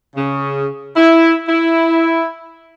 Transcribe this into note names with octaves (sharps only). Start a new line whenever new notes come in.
C#3
E4
E4